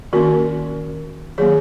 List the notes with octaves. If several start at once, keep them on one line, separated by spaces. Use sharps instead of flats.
D#3 A#3 C#4 F#4 A#4
D#3 F#3 A#3 G#4 C#5